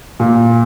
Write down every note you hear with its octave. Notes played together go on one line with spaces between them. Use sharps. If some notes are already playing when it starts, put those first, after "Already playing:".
A#2